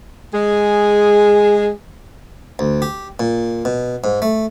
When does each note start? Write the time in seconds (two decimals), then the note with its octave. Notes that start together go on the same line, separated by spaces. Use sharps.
0.34 G#3 G#4
2.59 D2
2.82 G4
3.20 A#2
3.65 B2
4.04 G#2
4.22 A3